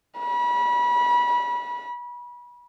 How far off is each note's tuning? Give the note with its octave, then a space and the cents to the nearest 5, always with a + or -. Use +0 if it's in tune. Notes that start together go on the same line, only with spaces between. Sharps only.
B5 -30